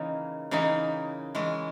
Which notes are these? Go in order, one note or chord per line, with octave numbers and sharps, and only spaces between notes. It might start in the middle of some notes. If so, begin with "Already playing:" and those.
Already playing: C#3 E3 A#3 D#4
C#3 E3 A#3 D#4
E3 G#3 C#4